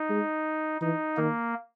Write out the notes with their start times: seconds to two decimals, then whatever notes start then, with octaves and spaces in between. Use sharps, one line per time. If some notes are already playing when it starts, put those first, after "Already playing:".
Already playing: D#4
0.09 G#3
0.81 E3 D#4
1.17 D#3 A#3